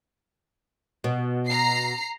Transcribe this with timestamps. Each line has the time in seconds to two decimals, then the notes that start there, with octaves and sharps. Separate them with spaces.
1.04 B2
1.48 A#5 C7